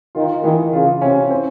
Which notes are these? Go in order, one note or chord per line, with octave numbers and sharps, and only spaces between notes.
D#3 F4
D#3 E3
C#3 F4
C3 C#4
C4